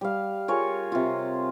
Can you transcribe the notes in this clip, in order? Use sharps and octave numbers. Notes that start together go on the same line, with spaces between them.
G3 F5
F4 G#4 A#4 C#5
C3 F4